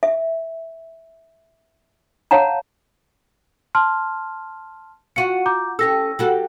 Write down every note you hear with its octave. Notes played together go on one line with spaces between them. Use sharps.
E5
C#5 F5 F#5 A5 A#5
A5 C6 F6
F4 F#4 C#7 D#7
A#5 D6 G6
C#4 G4 A4 E6 A#6
G3 F#4 A4